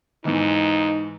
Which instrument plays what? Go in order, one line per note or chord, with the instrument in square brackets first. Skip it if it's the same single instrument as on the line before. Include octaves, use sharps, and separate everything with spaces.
[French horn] F2 [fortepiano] G#2 E3 [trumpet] D#4